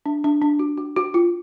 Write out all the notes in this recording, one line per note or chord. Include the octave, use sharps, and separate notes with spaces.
D4
D4
D4
F#4
F#4
F#4
F4